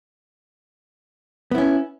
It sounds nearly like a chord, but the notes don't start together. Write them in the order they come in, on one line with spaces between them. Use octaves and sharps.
B3 E4 C#4